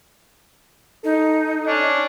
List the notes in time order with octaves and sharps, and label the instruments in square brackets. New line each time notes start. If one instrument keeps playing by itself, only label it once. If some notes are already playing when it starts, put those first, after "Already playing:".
[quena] D#4 [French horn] A4
[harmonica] C#4 D4